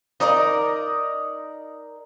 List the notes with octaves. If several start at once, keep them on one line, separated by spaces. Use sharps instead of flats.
D#4 A#4 D5 D#5